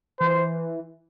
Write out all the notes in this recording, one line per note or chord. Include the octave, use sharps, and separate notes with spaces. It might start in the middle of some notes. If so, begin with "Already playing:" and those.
E3 C5